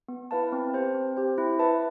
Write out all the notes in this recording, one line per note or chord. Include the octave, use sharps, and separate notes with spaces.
B3
E4 B4 F5 A5
C4
G4 C5
C4
G4 C5
E4
B4 E5 A5